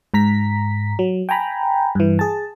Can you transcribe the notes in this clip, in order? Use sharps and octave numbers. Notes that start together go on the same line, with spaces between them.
G#2 A#5 B6
F#3
G5 G#5 A#5 B5
G2 E3
G#4 A5